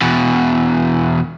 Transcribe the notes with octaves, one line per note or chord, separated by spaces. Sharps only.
E2 B2